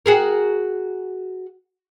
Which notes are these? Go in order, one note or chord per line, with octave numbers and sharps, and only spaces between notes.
F#4 G#4 A#4